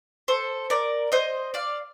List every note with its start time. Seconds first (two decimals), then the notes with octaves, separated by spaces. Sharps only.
0.28 A4 C5
0.70 A#4 D5
1.12 C5 D#5
1.54 D5 F5